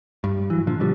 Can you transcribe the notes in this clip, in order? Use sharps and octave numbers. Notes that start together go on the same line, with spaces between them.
G2 G3
E3 F#3
A#2 D3 F3
B2 D3 F3 G3